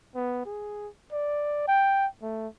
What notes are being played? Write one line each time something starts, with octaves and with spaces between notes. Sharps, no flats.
B3
G#4
D5
G5
A3